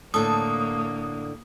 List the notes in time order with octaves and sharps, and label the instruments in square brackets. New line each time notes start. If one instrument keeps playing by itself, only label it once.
[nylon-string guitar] A2 D3 [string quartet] A#3 [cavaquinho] A4 C#5 A5 [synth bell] D#6